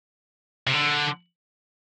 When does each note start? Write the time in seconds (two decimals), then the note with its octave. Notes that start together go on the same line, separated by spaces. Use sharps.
0.67 C3
0.73 D3